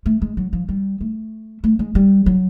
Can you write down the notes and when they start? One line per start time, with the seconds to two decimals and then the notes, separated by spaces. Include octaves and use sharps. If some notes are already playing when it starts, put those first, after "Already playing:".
0.06 A3
0.22 G#3
0.37 F#3
0.53 F3
0.69 G3
1.01 A3
1.64 A3
1.79 G#3
1.95 G3
2.26 F#3